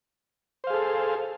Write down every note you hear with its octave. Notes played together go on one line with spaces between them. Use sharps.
G#4 A4 C5 F5